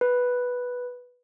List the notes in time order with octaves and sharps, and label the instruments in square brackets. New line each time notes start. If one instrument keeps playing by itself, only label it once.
[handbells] B4